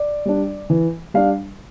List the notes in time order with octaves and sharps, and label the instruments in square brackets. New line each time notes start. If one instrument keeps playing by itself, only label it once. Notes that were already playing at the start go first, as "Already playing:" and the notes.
Already playing: [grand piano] D5
G3 D4
E3
G3 D4 F5